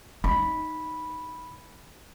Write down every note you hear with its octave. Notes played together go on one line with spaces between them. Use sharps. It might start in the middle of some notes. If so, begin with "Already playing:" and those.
D#4 B5